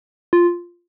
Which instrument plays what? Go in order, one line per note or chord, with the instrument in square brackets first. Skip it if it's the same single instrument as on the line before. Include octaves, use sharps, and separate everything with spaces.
[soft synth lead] F4